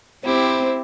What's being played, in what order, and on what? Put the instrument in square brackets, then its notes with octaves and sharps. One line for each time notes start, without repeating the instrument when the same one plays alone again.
[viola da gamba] C4 [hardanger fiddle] E4 G4 [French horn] C5